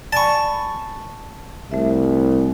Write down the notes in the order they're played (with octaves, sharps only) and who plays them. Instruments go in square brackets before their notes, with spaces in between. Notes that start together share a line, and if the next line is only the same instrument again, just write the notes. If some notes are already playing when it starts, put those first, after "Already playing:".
[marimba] D5 G#5 B5 [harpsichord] A5 C#6
[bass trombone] C2 [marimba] A3 E5